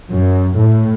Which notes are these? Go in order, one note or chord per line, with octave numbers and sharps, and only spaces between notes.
F#2
A2